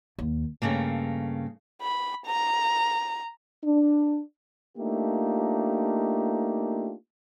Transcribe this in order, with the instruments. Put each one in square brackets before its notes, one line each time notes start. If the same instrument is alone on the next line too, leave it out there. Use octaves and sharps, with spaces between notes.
[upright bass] D#2
[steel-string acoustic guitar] G2 A#2 C#3 A3 A#3
[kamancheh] B5
A#5
[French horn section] D4
[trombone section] A3 A#3 D4 D#4 F4 G4